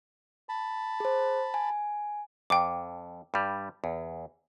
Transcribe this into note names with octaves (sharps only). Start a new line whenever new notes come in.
A5 B5
G#4 C5
G#5
F2 G5 D6
G2 G3
E2